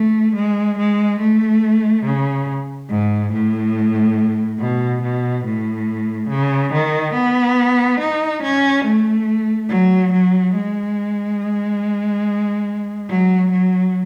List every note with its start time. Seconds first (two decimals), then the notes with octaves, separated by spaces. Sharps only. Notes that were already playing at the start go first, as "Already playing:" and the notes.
Already playing: A3
0.35 G#3
0.78 G#3
1.21 A3
2.05 C#3
2.90 G#2
3.32 A2
4.60 B2
5.03 B2
5.45 A2
6.29 C#3
6.73 D#3
7.14 B3
8.00 D#4
8.43 C#4
8.85 A3
9.69 F#3
10.12 F#3
10.54 G#3
13.09 F#3
13.51 F#3